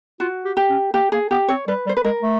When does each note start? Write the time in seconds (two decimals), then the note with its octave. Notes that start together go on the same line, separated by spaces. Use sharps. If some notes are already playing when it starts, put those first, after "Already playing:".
0.20 F4 F#4
0.45 G4
0.57 G4
0.69 C#4
0.94 A#3 G4
1.12 A#3 G#4
1.31 B3 G4
1.49 C4 C#5
1.68 G3 B4
1.86 G3
1.89 C5
1.97 B4
2.04 G#3 A#4
2.22 A3